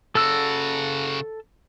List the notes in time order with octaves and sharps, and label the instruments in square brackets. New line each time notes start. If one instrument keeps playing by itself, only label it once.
[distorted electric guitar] C#3 F#4 [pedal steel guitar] A4 E6